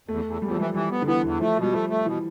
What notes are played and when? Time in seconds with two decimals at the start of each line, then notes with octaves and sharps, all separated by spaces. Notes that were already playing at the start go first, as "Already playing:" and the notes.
0.08 E2 A3
0.25 E2
0.42 E2 G3
0.50 F3
0.59 E3 G3
0.74 E3 G3
0.91 B3
1.02 D3
1.07 E3 B3
1.23 E2
1.39 F3 A3
1.57 B2
1.62 G3
1.72 F3 A3
1.89 A3
2.05 B2 E3